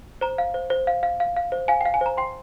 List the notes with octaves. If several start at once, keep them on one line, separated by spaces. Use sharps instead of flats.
C5 A#5
F5
C5
C5
F5
F5
F5
F5
C5
F5 G#5
F5 G5
G#5
C5 A#5
G5 C6